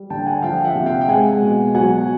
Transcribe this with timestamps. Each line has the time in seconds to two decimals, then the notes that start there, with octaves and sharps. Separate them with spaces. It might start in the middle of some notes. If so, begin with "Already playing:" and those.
Already playing: G3
0.10 D3 G5 A5
0.26 F#5 G#5
0.42 F3 F5 G5
0.64 E5 F#5
0.75 C3
0.86 F5 G5
1.01 G5
1.08 G#3 F#5 G#5
1.42 B2
1.75 F#3 F#5 G#5